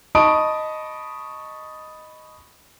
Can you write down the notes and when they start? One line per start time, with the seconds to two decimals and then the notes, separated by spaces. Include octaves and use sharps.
0.15 D#5 A5 B5 C#6 D#6 D7